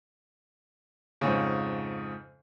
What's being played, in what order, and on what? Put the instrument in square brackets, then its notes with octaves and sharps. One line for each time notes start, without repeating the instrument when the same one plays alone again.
[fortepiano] F2 G#2 C#3